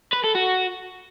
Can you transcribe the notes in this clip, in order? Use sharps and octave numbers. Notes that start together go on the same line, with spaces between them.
B4
A4
F#4